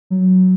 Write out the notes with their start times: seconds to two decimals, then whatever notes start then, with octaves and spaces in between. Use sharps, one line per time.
0.10 F#3